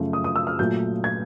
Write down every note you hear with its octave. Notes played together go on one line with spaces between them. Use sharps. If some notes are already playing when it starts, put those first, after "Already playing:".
Already playing: F#2 C#3 F3 A3
D#6
D#6
E6
F6
A#2 F#3 A3 G6
G#6